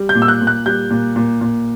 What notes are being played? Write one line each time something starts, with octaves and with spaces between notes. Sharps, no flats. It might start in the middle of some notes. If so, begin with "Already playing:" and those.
Already playing: G3
G6
A#2
E6
F#6
A#2
F#6
G3 G6
A#2
A#2
A#2